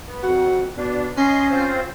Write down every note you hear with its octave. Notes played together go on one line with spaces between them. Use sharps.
B3
F2 F#4
B2 D4
C#4 D#5 C6
C4 F4 C5